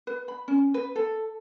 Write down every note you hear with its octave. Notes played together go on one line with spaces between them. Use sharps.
B4
B5
C#4
B4
A4